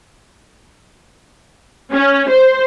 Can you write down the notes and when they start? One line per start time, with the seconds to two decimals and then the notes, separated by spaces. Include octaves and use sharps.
1.92 C#4
2.29 C5